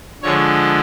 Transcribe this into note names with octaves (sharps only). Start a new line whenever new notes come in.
D3 F3 G#3 C#5